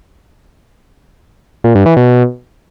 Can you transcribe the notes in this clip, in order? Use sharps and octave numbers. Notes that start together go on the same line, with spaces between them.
A#2
G2
E3
B2